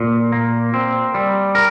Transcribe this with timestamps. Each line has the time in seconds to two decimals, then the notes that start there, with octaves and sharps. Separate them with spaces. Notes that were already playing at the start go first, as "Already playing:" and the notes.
Already playing: A#2
0.32 A#3
0.74 C4
1.14 G3
1.55 A#4